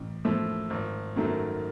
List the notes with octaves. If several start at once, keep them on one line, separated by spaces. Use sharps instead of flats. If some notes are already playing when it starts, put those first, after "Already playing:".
Already playing: A1
A2 F3 A3
G#1
F#2 D#3 F#3 A3